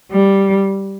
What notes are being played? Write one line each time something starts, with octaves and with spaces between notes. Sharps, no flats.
G3